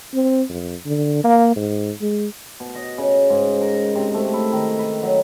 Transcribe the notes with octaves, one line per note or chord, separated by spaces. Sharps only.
C4
F2
D3
A#3
G#2
G#3
B2
D#5
C#3
G#2
A#4
C3
A3
E4
D#3
B4
F#3